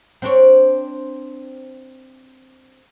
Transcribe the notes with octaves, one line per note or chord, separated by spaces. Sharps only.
C4 D4 C#5